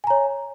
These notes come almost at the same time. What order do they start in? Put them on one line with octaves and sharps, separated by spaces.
G#5 A#5 C#5